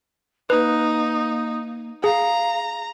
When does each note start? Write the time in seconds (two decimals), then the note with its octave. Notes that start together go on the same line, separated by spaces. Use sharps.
0.50 A#3 D#4 B4
2.04 G#4 F5 A#5